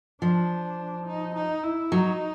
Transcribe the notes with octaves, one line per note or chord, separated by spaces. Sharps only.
F3 D4
D#4
D#4
E4
F#3 D#4